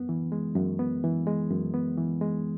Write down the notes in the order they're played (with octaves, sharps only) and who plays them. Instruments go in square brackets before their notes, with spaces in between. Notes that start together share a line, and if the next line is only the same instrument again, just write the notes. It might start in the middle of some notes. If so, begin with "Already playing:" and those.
Already playing: [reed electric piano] F#2 B3
E3
G#3
F#2
B3
E3
G#3
F#2
B3
E3
G#3